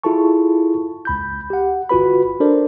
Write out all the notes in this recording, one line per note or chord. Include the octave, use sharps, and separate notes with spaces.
E4 F4 G#4 A4 A5 C#6
C#2 B5 G6
G4 F#5
G1 F4 F#4 B4 B5
D4 A4 A#4 C5 D5